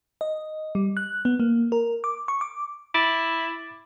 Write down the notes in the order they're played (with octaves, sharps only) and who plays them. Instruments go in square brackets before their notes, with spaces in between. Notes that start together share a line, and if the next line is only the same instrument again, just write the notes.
[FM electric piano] D#5
G3
F#6
B3
A#3
A#4
D6
C#6
D6
[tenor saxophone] E4 [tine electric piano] D6 A6